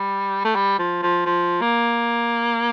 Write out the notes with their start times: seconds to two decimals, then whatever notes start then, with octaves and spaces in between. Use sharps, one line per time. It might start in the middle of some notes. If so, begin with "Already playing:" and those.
Already playing: G3
0.45 A3
0.55 G3
0.79 F3
1.03 F3
1.26 F3
1.61 A#3